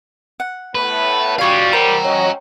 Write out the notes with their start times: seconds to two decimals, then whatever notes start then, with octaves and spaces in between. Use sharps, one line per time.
0.40 F#5
0.75 A2 A3 B3 B4
1.39 G3 F4 F#4 C#5 F5 C#6
1.73 A#4 C5 F#5 G5 A#5
2.05 C#4 F#4 C#5 D#5